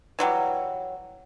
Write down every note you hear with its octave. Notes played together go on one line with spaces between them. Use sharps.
E3 F#3 G3